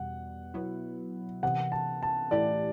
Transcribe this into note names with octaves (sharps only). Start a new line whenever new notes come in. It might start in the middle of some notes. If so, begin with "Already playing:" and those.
Already playing: E2 B2 G3 F#5
B2 F#3 B3 E4
C3 E3 B3 F#5
A5
A5
A2 E3 A3 E4 G4 D5